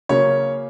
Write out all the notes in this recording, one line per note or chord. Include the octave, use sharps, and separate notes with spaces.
C#3 F#3 A#3 C#4 C#5